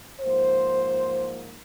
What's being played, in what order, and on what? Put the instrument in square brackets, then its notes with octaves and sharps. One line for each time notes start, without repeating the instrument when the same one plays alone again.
[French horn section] G#2 F3 A#3 C5